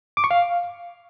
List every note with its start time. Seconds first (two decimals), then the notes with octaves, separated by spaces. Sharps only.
0.17 D6
0.24 C#6
0.31 F5